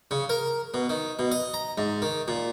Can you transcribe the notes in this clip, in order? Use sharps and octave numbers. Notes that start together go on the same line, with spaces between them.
C#3
A#4
B2
D#3
B2
D#5
A#5
G#2
D#3
A#2